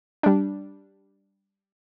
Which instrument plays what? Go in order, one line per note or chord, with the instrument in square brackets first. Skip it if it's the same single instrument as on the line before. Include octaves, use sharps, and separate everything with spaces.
[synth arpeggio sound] G3 D4